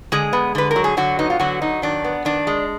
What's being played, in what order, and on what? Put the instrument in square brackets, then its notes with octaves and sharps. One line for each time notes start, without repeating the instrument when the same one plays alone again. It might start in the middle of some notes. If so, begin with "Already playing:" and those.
[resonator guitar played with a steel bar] D3 G#3 G#4
B3
D3 B4
A#4
F#3
G#4
D3 F#3 F#4
B3 D#4
F4
D3 F#3 F#4
F#3 D#4
D#3 D4
B3
D#3 D4
G#3